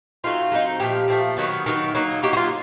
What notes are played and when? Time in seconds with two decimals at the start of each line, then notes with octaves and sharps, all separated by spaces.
0.24 F#3 A3 C4 D#4 F4
0.52 F#3 A3 C4 D#4
0.80 A#2 F3 A3 G4
1.08 A#2 F3 A3
1.37 D#3 F#3 B3
1.66 D#3 F#3 B3
1.95 F#3 A#3 D#4
2.22 F#3 A#3 D#4 G4
2.33 F#4
2.37 F4